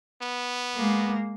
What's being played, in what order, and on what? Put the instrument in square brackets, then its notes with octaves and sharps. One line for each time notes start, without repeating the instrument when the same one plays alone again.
[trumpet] B3
[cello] G#3 A#3